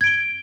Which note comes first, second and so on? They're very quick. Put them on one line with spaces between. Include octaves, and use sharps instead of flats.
G#6 D7 G7